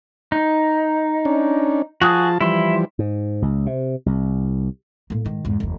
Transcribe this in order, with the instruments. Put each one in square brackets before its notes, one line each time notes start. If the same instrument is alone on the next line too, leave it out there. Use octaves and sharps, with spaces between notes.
[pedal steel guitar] D#4
[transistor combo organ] C#4 D4
[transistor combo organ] F3 F4 A5 [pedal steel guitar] F#4 G#4 D#6
[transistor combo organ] E3 F3 G3 [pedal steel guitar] E4 C6
[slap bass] G#2
C#2
C3
C2
[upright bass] A2 A#3
G#2 D#3
E2 G#2
F1 D#2